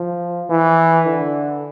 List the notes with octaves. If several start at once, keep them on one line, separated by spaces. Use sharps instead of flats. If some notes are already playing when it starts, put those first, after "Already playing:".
Already playing: F3
E3
D3